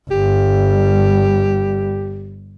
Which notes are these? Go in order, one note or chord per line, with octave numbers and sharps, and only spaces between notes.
G1 G3 G4